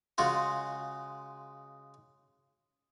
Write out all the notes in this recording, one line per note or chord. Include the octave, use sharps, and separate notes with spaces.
C#3 G#3 F4 F#4